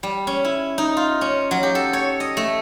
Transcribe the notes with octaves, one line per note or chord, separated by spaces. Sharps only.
G3
C#4
E4
D#4
F4
C#4
F#3
G4
A4
C#5
D#5
A3